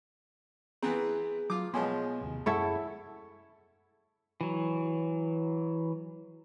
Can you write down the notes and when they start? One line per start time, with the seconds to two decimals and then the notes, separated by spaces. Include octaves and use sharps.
0.83 E3 B3 C4 G#4 A#5
1.50 F#3 F4 D6
1.74 B2 F3 G#3 B3 C#5 G#5 C6
2.21 A1 D#2 C3
2.46 F#2 E4 G#4 A4 C#5 F#5 B5
4.41 E3 F#3